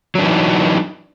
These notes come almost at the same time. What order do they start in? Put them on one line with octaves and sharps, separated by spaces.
F#3 D4 E3 D#4